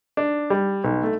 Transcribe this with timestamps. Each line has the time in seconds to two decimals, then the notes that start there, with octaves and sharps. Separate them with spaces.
0.17 D4
0.50 G3
0.84 B1
1.03 A3